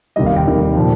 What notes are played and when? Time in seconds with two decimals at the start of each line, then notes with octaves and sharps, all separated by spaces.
0.16 F1 D#2 D#3 G3 D#5
0.26 F5
0.36 G5
0.45 F1 D#2 D#3 G3
0.76 A#2 F3